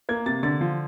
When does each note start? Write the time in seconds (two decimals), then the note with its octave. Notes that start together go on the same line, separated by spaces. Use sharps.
0.09 A#3 G#6
0.26 C3 A6
0.43 D3 A6
0.61 F3